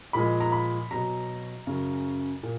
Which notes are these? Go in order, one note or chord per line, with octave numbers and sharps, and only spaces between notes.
A#2 F3 G#3 B5
A#5
B5
B2 F#3 A#5
F#2 C#3 F#3
A#2